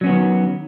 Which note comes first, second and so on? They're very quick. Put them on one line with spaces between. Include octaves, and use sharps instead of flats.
F#3 C#4 B3 D#3